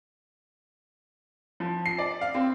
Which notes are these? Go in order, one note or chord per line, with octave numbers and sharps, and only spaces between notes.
F3
C7
D5
F5
C4